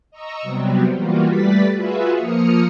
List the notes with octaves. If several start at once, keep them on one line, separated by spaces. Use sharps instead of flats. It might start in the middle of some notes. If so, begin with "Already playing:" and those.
D#5 A#5 C#6 E6
C3 F#3 G3 B3 C4
E3 G3 A#3 F4 F#4
G3 A3 B4 D5 A6 B6
F4 F#4 G#4 B4 E5
F3 A#3 D#6 F6 C#7